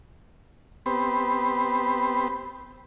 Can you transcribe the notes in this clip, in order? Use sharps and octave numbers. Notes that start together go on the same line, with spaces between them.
B3 C4 G4 B4 C5